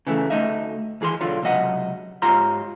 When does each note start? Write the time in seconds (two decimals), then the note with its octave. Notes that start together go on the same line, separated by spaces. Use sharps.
0.07 C#3 E3 A3
0.30 D2 D3 A3 D#4 D#5 E5
1.01 D#2 E3 G#4 B4 C6
1.21 B1 D3 F4 C#5
1.42 C#2 C3 F#3 D#5 F#5
2.22 G#2 F4 G4 C#5 A#5 C6